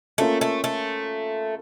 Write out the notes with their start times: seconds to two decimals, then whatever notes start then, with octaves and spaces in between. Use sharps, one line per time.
0.18 A3 A#3 C#4 F4 A4
0.41 A3
0.64 A3